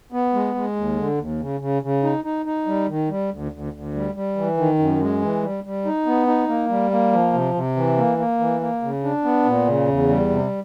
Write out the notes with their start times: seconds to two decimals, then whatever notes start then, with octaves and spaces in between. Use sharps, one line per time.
0.12 B3
0.34 G#3
0.55 G#3
0.76 D#2
0.97 D3
1.18 D#2
1.40 C#3
1.60 C#3
1.82 C#3
2.03 D#4
2.24 D#4
2.46 D#4
2.67 G3
2.88 D#3
3.09 G3
3.31 D2
3.52 D2
3.73 D2
3.94 G3
4.15 G3
4.36 E3
4.57 D#3
4.79 F#2
5.01 G#3
5.21 E3
5.43 G3
5.64 G3
5.85 D#4
6.06 B3
6.27 D#4
6.48 A#3
6.69 G3
6.91 A#3
7.13 F3
7.33 C3
7.54 C3
7.76 E3
7.97 A#3
8.18 A#3
8.39 E3
8.60 A#3
8.82 C#3
9.04 D4
9.24 B3
9.45 A#2
9.67 C#3
9.88 E2
10.09 G3
10.30 C3